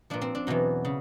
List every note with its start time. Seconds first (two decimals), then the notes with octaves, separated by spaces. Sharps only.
0.10 A#2 F3 D4
0.21 C4
0.35 D4
0.47 E2 B2 F#3
0.85 C#3